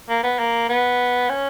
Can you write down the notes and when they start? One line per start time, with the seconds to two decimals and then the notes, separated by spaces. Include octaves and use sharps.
0.09 A#3
0.23 B3
0.39 A#3
0.69 B3
1.29 C#4